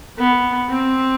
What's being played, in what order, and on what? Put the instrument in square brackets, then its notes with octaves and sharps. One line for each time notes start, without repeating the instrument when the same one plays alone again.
[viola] B3
C4